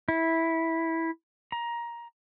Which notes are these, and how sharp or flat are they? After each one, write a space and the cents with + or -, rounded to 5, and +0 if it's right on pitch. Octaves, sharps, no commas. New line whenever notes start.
E4 -10
A#5 +15